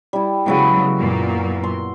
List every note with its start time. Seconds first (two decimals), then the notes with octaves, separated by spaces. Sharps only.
0.13 G3 E4
0.46 C#3 F#3 G#3 B3 E4 F#4
0.97 F#2 A#2 A#3
1.64 C6